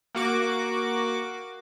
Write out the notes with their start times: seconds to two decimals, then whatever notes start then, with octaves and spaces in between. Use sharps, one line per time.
0.15 A#3 F#4 D6